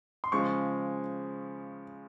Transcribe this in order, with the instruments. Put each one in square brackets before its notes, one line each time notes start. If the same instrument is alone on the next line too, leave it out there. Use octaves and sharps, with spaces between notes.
[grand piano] C6
C#3 F3 G#3 C#6